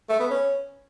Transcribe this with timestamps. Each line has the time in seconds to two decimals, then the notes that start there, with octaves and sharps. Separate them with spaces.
0.09 A3
0.20 B3
0.31 C#4